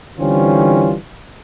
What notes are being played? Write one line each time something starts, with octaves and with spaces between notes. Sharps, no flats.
D3 E3 G3 C4 C#4 F4